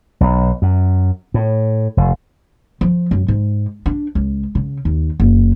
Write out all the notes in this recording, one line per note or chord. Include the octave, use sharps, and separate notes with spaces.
B1
F#2
A2
F1
F3
F#2
G#2
D4
C#2
C#3
D#2
F#1